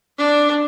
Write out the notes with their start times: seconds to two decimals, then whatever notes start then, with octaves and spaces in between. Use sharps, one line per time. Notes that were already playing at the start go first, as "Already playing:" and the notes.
0.18 D4